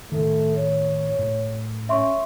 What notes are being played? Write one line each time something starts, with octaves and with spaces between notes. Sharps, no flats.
A2 D#3 A3
C#5
A2
C#4 E5 C6 C#6